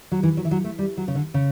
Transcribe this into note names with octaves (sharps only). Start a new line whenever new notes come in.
F#3
E3
F#3
E3
F#3
A3
G3
F#3
C#3
D3
C#3